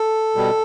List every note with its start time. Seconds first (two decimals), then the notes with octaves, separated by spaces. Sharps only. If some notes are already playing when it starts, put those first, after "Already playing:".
Already playing: A4
0.36 B2 G3